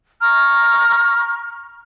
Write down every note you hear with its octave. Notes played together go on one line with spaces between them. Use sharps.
A#5 C#6 F6